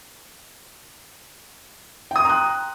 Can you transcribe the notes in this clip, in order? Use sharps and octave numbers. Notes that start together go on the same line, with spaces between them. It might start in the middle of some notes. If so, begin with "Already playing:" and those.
G5 A#5 C6 D#6 F#6